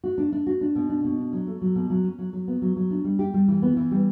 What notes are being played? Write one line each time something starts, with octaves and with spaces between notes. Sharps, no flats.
F#4
D4
D4
F#4
D4
B2
D4
B2
D4
F#3
A3
F#3
B2
F#3
C#4
F#3
F#3
B3
F#3
F#3
D4
G3
G4
G3
E3
B3
E3
G3